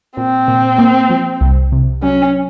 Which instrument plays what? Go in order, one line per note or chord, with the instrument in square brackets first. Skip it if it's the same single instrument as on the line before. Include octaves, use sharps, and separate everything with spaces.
[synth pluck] A#2 [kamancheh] C4
[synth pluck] A#2
A#3
F3
C2
C3
[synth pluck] F#3 [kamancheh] C#4